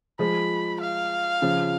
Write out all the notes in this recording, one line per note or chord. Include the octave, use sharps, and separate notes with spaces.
F3 G#3 B5
F5
C#3 F3